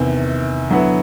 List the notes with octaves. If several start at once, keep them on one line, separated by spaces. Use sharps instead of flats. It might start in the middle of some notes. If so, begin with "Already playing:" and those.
Already playing: E2 C3 D#3
D3 F#3 B3 E4